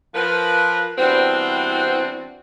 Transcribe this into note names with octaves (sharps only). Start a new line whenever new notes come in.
F3 A#4 B4
E3 G3 B3 C4 D4 F#4